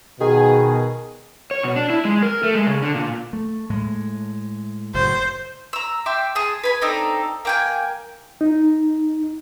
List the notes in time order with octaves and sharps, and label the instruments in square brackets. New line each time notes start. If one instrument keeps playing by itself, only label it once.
[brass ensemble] B2 [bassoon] D#3 [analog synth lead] G#4
[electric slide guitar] C#5
B2
D4
E4
G#3
A#4
A3
G#3
C#3
D3
A#2
[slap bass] A3
A2 G#3
[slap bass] F#1 A2 [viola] C5
[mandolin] A#5 E6
E5 G5 C6 D6
G#4 A5
B4 G#5 B5
C4 D4 D#4 A4
A#3 G5 G#5
[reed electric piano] D#4